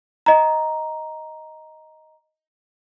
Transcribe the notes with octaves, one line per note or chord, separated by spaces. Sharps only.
D#5 A#5